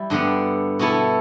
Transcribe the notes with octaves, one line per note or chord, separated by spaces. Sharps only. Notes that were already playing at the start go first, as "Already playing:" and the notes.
Already playing: G3 E4
G2 D3 B3
B2 B3 E4 A4